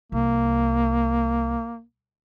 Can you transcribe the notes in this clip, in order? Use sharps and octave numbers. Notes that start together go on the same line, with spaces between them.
C2 A#3